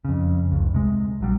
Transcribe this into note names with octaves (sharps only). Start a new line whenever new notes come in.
F2 C#3
F1 C#2
C3 G#3
A#1 F#3 G3